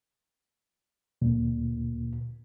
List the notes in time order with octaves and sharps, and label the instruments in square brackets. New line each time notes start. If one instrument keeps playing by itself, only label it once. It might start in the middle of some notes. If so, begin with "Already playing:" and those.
[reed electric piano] D2 A#2